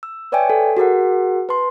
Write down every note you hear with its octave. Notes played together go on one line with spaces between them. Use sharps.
E6
B4 C#5 D5 E5 G5 G#5
A4 C#5
F#4 G#4 A#4 F#5
B4 A5 C6